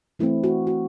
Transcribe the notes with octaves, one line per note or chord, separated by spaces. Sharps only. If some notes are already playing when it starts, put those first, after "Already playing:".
E3 A3 C4 E4
F#4
F#4